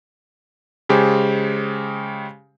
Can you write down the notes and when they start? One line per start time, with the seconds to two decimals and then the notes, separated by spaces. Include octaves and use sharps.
0.89 C#3 G#3 G4 C5